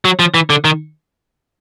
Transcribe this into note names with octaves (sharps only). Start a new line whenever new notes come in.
F#3
F3
E3
D3
D#3